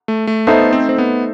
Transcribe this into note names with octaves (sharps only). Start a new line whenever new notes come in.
A3
A3
A3 B3 D#4 A4 C5 E5
C4
C4
B3